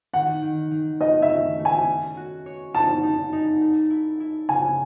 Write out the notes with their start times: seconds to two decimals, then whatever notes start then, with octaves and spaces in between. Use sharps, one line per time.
0.14 D#3 F#5
0.42 D#3
0.71 D#3
1.01 A3 D#5
1.22 E5
1.29 C#4
1.59 A3
1.65 G#5
1.88 C#4
2.17 F#4
2.46 C#5
2.74 D#4 A5
3.03 D#4
3.33 D#4
3.61 A3
3.90 E4
4.20 E4
4.49 C#3 G#5